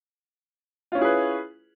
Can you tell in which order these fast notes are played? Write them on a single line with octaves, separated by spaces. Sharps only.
F4 C#4 E4 G#4 B4